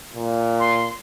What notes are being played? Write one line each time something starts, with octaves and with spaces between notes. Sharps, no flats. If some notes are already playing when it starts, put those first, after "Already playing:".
A#2
C6